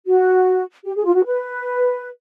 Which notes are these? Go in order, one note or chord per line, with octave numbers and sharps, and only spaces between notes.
F#4
G4
G#4
F4
F#4
B4